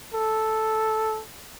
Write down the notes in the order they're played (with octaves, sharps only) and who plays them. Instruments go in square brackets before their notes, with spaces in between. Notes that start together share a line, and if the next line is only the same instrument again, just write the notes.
[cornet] A4